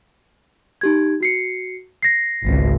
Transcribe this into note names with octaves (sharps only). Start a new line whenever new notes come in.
D#4 G4 G#6
F#4 C7 C#7
A#6 C7
G#1 C#2